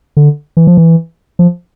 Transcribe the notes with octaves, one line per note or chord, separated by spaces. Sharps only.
D3
E3
F3
E3
F3